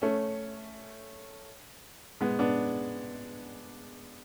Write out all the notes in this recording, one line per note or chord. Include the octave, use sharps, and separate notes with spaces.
A3 C#4
G#3 B3
B3 D4